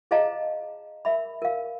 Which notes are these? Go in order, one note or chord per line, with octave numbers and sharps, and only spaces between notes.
G#4 C5 D#5 F5 A5 A#5
A#4 E5 B5
A#4 F5